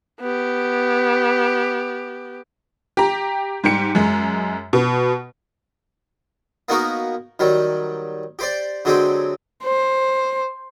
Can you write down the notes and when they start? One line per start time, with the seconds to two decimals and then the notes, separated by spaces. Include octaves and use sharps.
0.20 B3 G4
2.97 G4 A#5
3.64 G#2 G3 G4 C#7
3.95 F#2 G#3
4.73 B2
6.69 A#3 B3 D#4 F#4 A#4
7.39 D#3 F#3 G3
8.39 G4 C5 D5
8.85 D3 F#3 G#3 C4 G4
9.63 C5